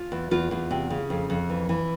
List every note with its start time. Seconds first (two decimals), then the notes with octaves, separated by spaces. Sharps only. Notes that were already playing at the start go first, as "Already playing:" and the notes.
Already playing: F4
0.12 E2
0.31 E2 F4
0.51 E2
0.71 C3
0.90 C#3
1.10 F2
1.30 F2
1.49 E3
1.69 E3